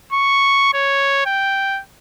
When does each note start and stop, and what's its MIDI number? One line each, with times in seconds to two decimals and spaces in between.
0.12 0.70 85
0.73 1.25 73
1.26 1.81 79